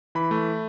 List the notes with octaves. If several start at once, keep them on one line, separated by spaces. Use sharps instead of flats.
E3 B5
A3